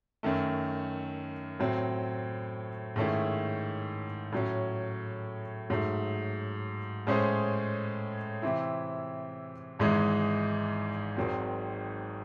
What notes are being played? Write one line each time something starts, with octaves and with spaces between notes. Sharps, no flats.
F#2 D#3 A3
A2 F#3 C4
G#2 D#3 A3 C#4 E4
A2 F#3 C#4
G#2 F#3 A3
A2 G#3 C#4 G#4 C5
C3 E3 C4 E4
G#1 G#2 E3 G#3 D#4
G#1 G#2 D#3 F#3 C4